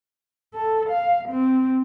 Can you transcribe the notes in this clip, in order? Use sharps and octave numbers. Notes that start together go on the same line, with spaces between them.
A4
F5
C4